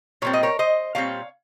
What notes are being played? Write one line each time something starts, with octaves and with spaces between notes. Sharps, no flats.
A#2 G3 C4 C#5
D#5
A#4 C#5
C5 D#5
A#2 G3 C4 C#5 F5